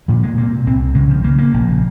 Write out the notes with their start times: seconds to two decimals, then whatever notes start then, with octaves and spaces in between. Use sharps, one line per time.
0.08 A#2 F3
0.23 G#3
0.37 C3 A#3
0.66 C2 C4
0.95 C#3 G#3
1.10 F3
1.23 C#3 A#3
1.38 A#3
1.54 A#1